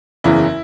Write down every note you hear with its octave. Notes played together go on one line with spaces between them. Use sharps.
F#1 E2 C#3 E3 E4